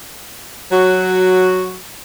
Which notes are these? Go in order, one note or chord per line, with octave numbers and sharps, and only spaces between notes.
F#3 F#4